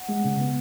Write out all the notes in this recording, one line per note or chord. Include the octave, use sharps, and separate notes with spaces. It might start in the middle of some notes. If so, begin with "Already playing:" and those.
Already playing: F#5
G#3
C#3
B3